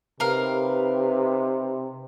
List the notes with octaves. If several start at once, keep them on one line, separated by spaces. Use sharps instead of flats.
C3 D#4 G4 A#4 B4 F5